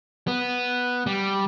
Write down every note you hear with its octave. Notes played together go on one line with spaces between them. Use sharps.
B3
G3